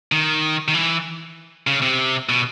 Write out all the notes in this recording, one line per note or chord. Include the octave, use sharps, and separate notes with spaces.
D#3
D#3
E3
C#3
C3
B2